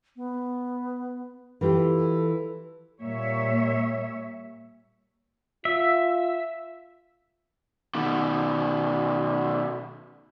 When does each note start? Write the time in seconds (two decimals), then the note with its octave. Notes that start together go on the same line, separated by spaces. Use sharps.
0.16 B3
1.61 E3 F4 G4 A4
3.01 A#2 G3 C#5 E5
5.65 F4 E5
7.95 B2 D#3